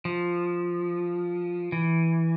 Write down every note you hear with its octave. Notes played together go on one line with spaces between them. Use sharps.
F3
E3